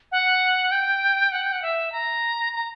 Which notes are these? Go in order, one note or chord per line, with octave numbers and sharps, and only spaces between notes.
F#5
G5
F#5
G5
F#5
E5
A#5
A#5